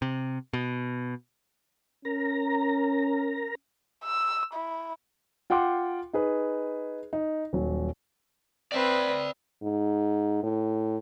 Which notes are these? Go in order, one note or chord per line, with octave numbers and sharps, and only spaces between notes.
C3
B2
C#4 A#4 A#5
E6
E4
F4 F#5 G5 C6 D6
D#4 G#4 B4
D#4
D#1 F#3
C4 B4 D5 E5
G#2
A2